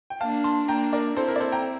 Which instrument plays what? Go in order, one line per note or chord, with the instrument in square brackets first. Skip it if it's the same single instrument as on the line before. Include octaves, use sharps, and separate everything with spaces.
[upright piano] G5
[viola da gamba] A#3 D4 [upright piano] F5 A5
[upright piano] A5 C6
[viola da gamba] A#3 D4 [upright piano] G5 A#5
[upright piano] A#4 D5
[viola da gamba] C4 E4 [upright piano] A4 C5
[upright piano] A#4
D5
A4 C5
G5 A#5